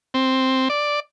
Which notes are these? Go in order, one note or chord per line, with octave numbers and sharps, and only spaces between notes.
C4
D5